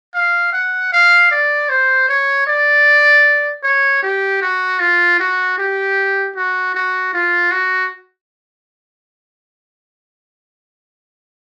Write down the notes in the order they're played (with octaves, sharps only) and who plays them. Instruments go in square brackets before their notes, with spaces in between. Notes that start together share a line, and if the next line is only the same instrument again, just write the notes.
[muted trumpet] F5
F#5
F5
D5
C5
C#5
D5
C#5
G4
F#4
F4
F#4
G4
F#4
F#4
F4
F#4